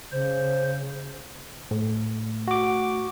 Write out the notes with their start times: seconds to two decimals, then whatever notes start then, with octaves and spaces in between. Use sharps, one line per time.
0.12 C#3 C5
1.71 A2
2.48 F#4 D6